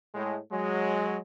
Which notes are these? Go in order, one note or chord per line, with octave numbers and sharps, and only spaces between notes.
A2 G#3
F#3 G#3